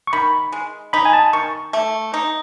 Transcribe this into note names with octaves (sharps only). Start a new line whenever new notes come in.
C#6
D#3 B5
G#3
D#4 B5
G#5
A5
D#3 C#6
A3
D#4